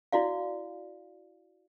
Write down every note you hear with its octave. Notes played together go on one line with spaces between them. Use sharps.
E4 F#4 D5 F5